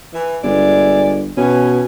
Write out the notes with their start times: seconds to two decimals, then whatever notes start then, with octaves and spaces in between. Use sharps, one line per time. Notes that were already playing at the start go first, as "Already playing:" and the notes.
0.14 E3
0.44 G1 G#3 E4 D5
1.37 B2 E3 C#4